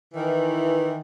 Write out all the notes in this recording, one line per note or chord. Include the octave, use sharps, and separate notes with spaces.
D#3 E3